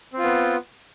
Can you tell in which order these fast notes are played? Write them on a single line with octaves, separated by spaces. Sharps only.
C4 F4 B3